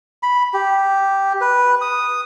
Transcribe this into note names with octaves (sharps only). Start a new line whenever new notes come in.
B5
G4
B4
D#6